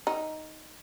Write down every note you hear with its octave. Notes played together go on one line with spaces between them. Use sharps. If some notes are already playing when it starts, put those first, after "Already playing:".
D#4